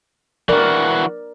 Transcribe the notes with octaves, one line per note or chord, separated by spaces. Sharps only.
E3 F#4 A#4 D5